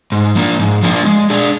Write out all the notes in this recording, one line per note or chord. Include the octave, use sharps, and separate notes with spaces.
G#2
F3 A#3 D4 F4
G#2
F3 A#3 D4 F4
G#3
D4 G#4